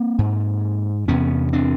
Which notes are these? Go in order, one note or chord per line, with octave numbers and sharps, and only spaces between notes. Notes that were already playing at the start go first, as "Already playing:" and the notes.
Already playing: A#3 C4
G#2
E2 C3 B3 C#4
C4 D4